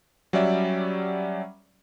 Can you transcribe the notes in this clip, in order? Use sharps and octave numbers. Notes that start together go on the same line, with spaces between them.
F#3 G3 C#4 D5 E5